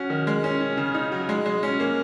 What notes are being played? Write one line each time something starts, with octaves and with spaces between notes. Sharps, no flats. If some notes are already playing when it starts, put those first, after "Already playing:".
Already playing: C#4 F#4
D#3
G#3
C#4
C#4
C#3
D#4
F#3
G#3
G#3
C#4
A#3